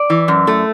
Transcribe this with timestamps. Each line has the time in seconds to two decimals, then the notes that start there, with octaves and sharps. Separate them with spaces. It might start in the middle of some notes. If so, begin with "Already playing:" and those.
Already playing: D5
0.10 E3
0.28 F#2
0.47 A3